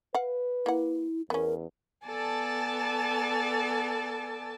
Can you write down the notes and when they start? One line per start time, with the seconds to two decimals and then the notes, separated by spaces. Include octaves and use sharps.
0.14 B4 F5 F#5
0.66 A#3 E4 F#5
1.30 E2 B3 C#4 A#4
2.07 B3 A4 D5 G#5 A5